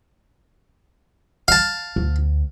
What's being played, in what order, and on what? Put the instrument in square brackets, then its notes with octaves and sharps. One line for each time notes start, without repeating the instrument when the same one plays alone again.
[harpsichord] F5 A5
[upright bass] D2